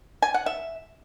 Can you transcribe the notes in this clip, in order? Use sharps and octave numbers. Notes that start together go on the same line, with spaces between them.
G#5
F#5
E5